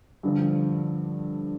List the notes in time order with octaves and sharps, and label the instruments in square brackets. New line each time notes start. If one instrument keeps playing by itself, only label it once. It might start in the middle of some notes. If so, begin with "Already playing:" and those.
[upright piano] G2 D3 F3